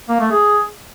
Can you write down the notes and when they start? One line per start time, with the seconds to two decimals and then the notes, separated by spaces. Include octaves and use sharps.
0.09 A#3
0.20 A3
0.31 G#4